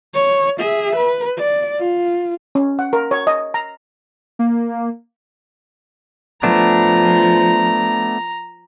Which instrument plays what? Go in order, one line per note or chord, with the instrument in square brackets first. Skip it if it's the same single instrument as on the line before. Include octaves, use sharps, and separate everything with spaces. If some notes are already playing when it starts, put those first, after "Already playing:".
[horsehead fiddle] C#5
G#4 E5
B4
D5
F4
[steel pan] C#4
F#5
A#4
C#5
D#5
A#5
[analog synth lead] A#3
[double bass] F3 [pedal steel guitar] A3 B3 D4 [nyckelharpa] A#5